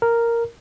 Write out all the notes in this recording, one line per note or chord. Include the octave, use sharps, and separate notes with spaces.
A#4